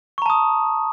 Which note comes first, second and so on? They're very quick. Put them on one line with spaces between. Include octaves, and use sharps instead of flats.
C#6 A#5 A5 D#6